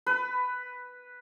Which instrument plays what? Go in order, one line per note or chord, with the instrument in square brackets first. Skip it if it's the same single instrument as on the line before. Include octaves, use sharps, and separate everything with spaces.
[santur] B4